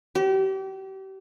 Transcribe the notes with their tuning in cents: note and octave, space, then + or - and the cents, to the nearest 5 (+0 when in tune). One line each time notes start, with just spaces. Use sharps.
G4 -35